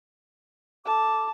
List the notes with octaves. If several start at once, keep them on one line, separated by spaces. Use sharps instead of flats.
A4 A5 D6